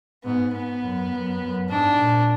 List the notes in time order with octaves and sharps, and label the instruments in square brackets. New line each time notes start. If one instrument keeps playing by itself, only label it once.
[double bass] G#2 [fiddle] B3
[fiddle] B3
[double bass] F#2
F#2
F#2
[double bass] G#2 [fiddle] D4
[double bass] A#2